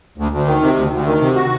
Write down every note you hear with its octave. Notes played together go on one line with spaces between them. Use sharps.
D2
D2
D#3
C3
D2
D2
D#3
C3
F#4